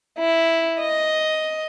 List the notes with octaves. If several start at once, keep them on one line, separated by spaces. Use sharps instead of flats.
E4
D#5